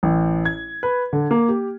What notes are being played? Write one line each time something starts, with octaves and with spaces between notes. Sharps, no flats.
A1
G#6
B4
D3
A#3
G4